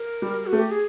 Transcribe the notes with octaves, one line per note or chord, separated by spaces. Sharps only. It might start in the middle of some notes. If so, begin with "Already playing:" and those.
Already playing: A#4
G3
F#4
A3
G4
G#4